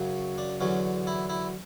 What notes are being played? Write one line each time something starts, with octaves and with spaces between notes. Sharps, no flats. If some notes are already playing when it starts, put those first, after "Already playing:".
Already playing: F#2 C#3 F#3
D4
E2 D3 F#3 C#4
E4
E4